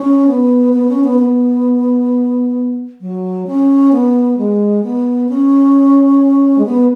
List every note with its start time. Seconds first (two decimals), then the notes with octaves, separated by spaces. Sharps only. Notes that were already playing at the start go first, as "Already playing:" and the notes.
Already playing: C#4
0.27 B3
0.73 B3
0.88 C#4
1.04 B3
1.19 B3
3.01 F#3
3.47 C#4
3.92 B3
4.38 G#3
4.83 B3
5.29 C#4
6.58 G#3
6.65 B3